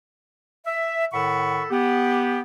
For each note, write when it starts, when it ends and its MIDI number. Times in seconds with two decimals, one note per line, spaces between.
0.66 1.06 76
1.13 1.65 45
1.13 1.65 51
1.13 1.65 69
1.13 1.65 78
1.13 1.65 83
1.13 1.65 85
1.71 2.40 59
1.71 2.40 67